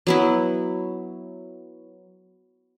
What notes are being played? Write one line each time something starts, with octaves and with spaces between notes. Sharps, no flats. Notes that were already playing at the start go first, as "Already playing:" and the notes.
F#3 B3 E4